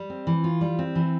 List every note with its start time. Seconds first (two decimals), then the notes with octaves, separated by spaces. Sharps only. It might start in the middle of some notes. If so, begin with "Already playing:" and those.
Already playing: G3
0.10 C4
0.27 E3
0.44 F4
0.61 G3
0.79 C4
0.95 E3